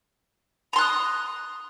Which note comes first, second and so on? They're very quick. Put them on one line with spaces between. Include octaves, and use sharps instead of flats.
A#5 C6 F#6 D#6